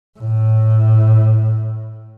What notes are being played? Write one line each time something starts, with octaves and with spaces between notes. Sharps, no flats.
A2